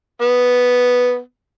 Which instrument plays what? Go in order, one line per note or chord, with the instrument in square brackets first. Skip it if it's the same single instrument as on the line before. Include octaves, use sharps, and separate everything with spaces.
[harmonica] B3